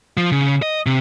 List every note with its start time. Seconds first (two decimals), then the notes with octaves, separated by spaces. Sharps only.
0.17 F3
0.32 C#3
0.62 D#5
0.86 C3